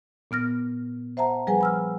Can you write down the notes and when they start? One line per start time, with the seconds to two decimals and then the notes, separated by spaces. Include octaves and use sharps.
0.31 A#2 B3 F6 A#6
1.17 C5 E5 F#5 A5 A#5
1.47 F3 G3 G#4 B4 F#5 G#5
1.61 B5 E6 F6